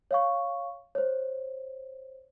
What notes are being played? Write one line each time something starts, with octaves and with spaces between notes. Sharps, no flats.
C#5 F5 C#6
C5 C#5